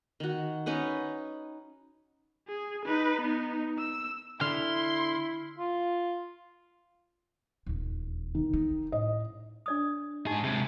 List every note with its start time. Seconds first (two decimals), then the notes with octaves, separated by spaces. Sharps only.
0.20 D#3 F#4
0.66 C#4 D#4 B4 F#5
2.48 G#4
2.86 D#4 B4
3.21 B3 D#4
3.78 E6
4.41 D3 E4 C6 F6
5.59 F4
7.67 D#1 E2
8.35 D#3
8.53 D#4
8.92 A2 D#5
9.66 D4 D5 D#6
10.27 G#2 D#4 G4 G#4
10.44 C3 G#3